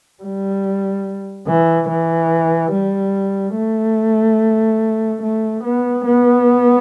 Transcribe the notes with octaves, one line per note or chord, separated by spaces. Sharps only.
G3
E3
E3
G3
A3
A3
B3
B3